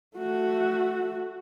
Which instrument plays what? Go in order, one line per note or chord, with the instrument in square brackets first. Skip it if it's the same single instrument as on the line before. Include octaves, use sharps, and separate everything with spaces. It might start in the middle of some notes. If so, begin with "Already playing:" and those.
[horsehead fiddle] A3 F#4